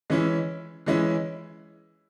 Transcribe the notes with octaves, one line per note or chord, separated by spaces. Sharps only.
E3 G#3 C#4 E4
E3 G#3 C#4 E4